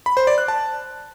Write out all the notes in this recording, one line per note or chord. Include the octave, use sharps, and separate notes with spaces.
B5
C5
D5
F#6
A5